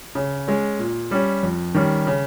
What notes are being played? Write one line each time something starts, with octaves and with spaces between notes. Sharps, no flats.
C#3
G#3 C#4
A#2
G3 C#4
F2
D#3 G3 C#4
C#3